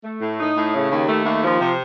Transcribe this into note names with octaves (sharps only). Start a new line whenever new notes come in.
A3
A2
D#4
A2
C#3
D#2
A3
D#2
F3
C3